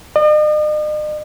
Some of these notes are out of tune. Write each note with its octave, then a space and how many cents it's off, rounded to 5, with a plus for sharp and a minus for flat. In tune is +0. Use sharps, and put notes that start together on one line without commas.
D#5 -45